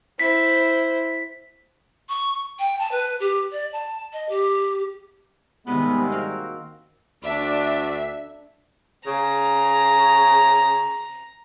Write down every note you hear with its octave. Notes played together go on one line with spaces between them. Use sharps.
E4 C5 B6
C#6
G5
A5
B4
G4
D5
A5
D#5
G4
G#2 C3 D#3 G3 G#3 B3 C4
A#3 F#4 A#4
D2 D4 E5
C#3 A#5